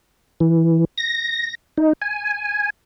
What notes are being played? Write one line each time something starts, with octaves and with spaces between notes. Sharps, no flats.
E3
A#6
D#4
G#5